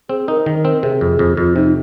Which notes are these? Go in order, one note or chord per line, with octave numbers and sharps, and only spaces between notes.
C4 G#4
D#4 A#4
D#3
C4
C3 G#4
F2
F2
F2 F4
C3 D#4